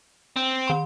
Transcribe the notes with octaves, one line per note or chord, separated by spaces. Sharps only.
C4
D#3 C6